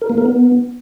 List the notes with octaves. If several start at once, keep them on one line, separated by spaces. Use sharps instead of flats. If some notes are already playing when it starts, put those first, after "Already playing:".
A#4
A#3
A#4
B3